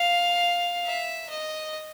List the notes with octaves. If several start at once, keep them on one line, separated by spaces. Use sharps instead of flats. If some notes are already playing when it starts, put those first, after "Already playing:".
Already playing: F5
E5
D#5